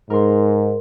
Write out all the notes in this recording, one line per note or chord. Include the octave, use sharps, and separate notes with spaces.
G#2 A#4 C6